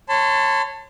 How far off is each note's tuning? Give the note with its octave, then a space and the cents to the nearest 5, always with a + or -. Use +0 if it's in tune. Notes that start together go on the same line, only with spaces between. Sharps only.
C#5 -15 A5 +15 C6 -40